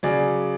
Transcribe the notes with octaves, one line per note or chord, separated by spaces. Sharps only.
C#3 F#3 D5